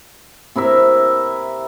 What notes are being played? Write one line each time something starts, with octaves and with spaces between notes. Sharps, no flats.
C3 E4 A#4 E5